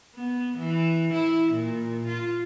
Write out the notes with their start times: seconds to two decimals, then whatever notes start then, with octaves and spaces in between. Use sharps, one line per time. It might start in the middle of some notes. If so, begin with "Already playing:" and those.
0.15 B3
0.58 E3
1.13 E4
1.52 A#2
2.08 F4